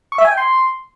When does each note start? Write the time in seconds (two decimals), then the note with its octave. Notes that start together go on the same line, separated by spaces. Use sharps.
0.12 C#6
0.18 E5
0.25 G#5
0.31 G5
0.37 C6